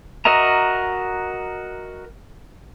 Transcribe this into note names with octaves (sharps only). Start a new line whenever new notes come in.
F#4 A#4 D#5 E5 A#5